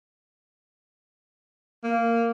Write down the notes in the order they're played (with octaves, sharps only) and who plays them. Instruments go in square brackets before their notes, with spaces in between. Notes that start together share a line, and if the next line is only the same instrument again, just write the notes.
[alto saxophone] A#3